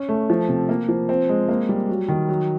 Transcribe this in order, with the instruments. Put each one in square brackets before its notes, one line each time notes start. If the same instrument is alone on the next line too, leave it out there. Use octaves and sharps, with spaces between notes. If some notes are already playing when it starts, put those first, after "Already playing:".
Already playing: [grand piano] C#4
A3
F3
C3
A#3
F3
C4
G#3
A#3
G3
F#3
D#3
F#3